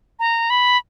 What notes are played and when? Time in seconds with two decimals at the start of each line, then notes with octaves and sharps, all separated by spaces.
0.19 A#5
0.50 B5